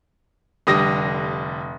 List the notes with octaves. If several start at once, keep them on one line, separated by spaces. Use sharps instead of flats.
F1 D3 G3 D#6 A#6